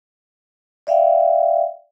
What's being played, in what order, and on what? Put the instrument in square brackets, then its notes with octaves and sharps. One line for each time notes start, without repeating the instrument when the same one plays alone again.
[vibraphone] D5 E5 F5 G5